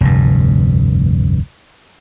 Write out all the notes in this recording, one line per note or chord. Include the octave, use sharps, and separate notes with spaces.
F1 D2 G2